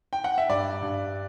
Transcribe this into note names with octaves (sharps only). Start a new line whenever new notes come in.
G5
F#5
E5
G2 D5
G2